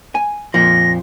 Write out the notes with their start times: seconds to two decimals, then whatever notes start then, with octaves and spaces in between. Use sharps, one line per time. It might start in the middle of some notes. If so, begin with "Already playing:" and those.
0.15 G#5
0.54 F2 A#2 F3 A#6